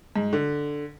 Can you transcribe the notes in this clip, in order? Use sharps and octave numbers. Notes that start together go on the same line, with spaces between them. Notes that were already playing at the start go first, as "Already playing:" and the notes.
G#2
D3